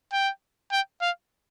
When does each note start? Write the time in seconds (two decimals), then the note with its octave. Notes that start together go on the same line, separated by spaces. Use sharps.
0.13 G5
0.72 G5
1.01 F5